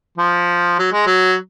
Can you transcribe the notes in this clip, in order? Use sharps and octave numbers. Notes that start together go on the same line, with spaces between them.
F3
F#3
G#3
F#3